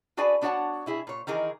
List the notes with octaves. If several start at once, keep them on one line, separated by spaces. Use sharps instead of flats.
D4 F#4 G#4 B4 D5 G#5
B3 D4 F#4 C#5 F#5 A5
B2 E4 G#4
A#2 C#5
D#3 E3 D#4 G#4 A#4